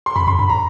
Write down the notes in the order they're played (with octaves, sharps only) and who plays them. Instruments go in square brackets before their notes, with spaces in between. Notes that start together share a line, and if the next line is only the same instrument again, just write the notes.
[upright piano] C6
[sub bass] F2 [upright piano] B5
[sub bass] F#2 [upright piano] C6
[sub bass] G2 [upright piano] B5
[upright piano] A#5